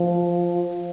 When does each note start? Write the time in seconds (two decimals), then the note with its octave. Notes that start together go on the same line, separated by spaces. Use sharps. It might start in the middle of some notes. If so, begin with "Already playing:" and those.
Already playing: F3